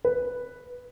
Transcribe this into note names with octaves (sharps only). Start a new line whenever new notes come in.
B4